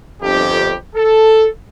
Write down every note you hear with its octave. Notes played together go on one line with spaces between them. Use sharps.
G1 F2 G4
A4